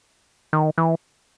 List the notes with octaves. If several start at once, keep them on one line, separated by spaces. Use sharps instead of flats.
D#3
E3